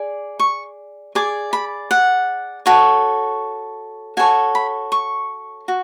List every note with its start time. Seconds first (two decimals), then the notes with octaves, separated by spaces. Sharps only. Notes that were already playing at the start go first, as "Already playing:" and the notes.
Already playing: G#4 D5
0.40 C#6
1.15 G#4 D5 D6
1.53 B5
1.91 F#5
2.66 F#4 A4 C#5
4.17 F#4 A4 C#5 G#5
4.55 B5
4.92 C#6
5.68 F#4